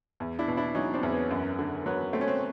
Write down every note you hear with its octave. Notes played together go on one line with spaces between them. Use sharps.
E2
D4 E4
B2
D4 E4
F#3 C#4 D#4
C4 D4
E2
B3 C#4
F#2
D3
F#3 B3
A3 C4
C#4
C4